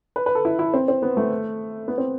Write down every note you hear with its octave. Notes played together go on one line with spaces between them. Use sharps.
B4
B4
A4
E4
E4
C4
C4
B3
A3
B3
C4